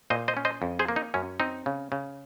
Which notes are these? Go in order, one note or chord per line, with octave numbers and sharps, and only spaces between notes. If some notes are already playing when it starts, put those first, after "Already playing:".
A#2 C5 D#5
C5 D#5
C#4
C5 D#5
F2
G#4 C5
A#3
D#4
F#2 C#4
C4 D#4
C#3
C#3